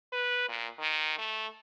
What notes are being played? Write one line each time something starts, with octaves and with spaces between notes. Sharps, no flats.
B4
A#2
D#3
A3